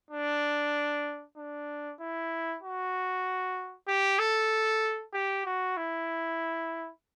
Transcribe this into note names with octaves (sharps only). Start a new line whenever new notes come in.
D4
D4
E4
F#4
G4
A4
G4
F#4
E4